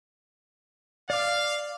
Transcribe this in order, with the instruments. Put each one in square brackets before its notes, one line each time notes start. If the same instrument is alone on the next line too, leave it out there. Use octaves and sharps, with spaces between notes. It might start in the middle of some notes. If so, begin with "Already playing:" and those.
[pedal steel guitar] D5 D6 [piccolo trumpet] F5